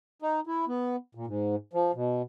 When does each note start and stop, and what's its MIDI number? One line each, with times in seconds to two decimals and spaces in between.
0.22 0.40 63
0.47 0.65 64
0.68 0.96 59
1.15 1.26 46
1.27 1.55 44
1.73 1.92 53
1.95 2.22 47